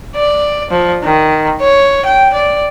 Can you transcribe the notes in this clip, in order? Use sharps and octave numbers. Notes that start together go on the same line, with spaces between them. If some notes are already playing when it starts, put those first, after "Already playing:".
D5
F3
D#3
C#5
G5
D5